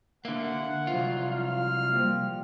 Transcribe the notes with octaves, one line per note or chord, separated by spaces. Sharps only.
D3 A#3 E5 F#5
C2 F3 F#3 F4
F6
A#2 F3 G3